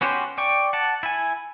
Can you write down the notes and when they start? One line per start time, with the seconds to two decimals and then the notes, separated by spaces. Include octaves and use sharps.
0.01 B3 C#4 F#4 G4 C5
0.38 D5 G5 C#6
0.73 F#5 A5
1.03 E4 G#5